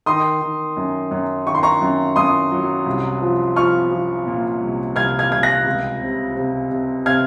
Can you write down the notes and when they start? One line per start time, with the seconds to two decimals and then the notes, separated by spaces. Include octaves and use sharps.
0.06 D#3 C6 D#6
0.41 D#3
0.77 F#2
1.11 F#2
1.46 D#3 C#6
1.55 C6
1.63 A#5 C#6
1.82 F#2
2.16 F#2 C6 D#6
2.52 F#3
2.86 C2
3.22 F3
3.56 F3 C#6 F6
3.91 F3
4.27 A#2
4.61 C2
4.96 C2 F6 G#6
5.19 F6 G#6
5.32 C2 G#6
5.43 F#6 A#6
5.67 C#2
6.01 C3
6.36 C3
6.71 C3
7.06 C3 F6 G#6